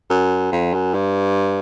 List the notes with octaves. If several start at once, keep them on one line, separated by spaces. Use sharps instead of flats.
F#2
F2
F#2
G2